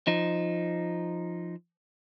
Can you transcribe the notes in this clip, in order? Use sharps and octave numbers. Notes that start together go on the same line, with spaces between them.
F3 D#4